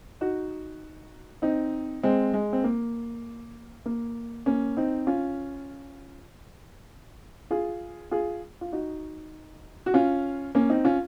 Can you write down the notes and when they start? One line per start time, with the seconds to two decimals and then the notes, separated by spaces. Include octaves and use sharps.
0.21 D#4 F#4
1.42 C4 D#4
2.03 G#3 C4
2.34 G#3
2.53 C4
2.64 A#3
3.86 A#3
4.46 A#3 C#4
4.77 C4 D#4
5.07 C#4 F4
7.51 F4 G#4
8.11 F4 G#4
8.61 F4
8.72 D#4 F#4
9.86 F#4
9.94 C#4 F4
10.55 A#3 C#4
10.70 C4 D#4
10.85 C#4 F4